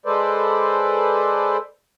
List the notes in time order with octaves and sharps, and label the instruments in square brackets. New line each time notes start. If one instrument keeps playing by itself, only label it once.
[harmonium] G#3 A4 B4 C5 D5